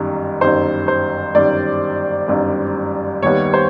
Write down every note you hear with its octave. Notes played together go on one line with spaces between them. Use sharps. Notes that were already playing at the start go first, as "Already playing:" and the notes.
Already playing: G1 F#2 D#3 G3
G1 F#2 D#3 G3 C5
C5
G1 F#2 D#3 G3 D5
G1 F#2 D#3 G3
D#2 D#3 G3 B3 C#5
C5